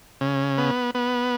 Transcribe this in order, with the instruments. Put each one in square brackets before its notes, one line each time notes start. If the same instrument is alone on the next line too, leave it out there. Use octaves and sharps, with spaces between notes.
[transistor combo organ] C#3
B3
B3